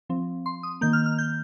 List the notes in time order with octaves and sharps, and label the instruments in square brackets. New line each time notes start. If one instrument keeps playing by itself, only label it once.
[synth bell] F3 C4
C6
D#6
D#3 A#3 G6
F6
F6
G6